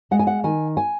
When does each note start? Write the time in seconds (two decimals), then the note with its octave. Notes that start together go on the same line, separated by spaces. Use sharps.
0.11 G#3 F#5
0.19 G#5
0.27 F#5
0.44 D#3 G#5
0.77 G#5